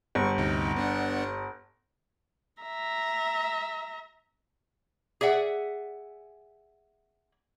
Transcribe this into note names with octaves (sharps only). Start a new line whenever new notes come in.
G1 C#6
D2 C3 D#4
B3 D4 F#5
E5 A#5
G#4 D5 E5 F#5